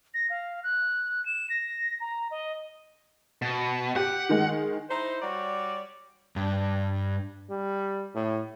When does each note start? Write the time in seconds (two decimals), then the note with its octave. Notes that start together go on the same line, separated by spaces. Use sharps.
0.14 A#6
0.30 F5
0.64 F#6
1.25 E7
1.50 A#6
2.00 A#5
2.31 D#5
3.42 B2
3.96 G4 F#5
4.29 D#3 G#3
4.89 D#4 E4 C5
5.22 G3 F#4 C#5 D5
6.36 G2
7.50 G3
8.15 A2